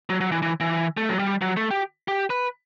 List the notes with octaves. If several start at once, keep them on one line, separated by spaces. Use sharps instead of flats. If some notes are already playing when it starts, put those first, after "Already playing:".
F#3
F#3
E3
E3
E3
A3
F#3
G3
F#3
A3
G4
G4
B4